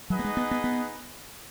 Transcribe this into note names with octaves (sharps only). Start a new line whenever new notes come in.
F#3 D#4 G#4 B4 D#5 F#5
A#3
G#3
B3
B3
B3